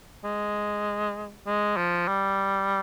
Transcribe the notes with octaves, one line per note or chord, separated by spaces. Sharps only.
G#3
G#3
F3
G3